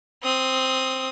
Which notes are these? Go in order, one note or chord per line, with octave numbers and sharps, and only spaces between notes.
C4 D#6